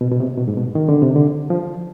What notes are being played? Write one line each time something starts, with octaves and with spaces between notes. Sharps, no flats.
B2
B2
C3
B2
G#2
B2
D#3
D3
C3
D3
F3